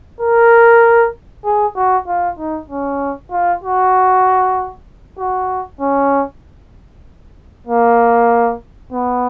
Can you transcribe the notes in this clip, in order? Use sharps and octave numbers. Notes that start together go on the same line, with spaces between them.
A#4
G#4
F#4
F4
D#4
C#4
F4
F#4
F#4
C#4
A#3
B3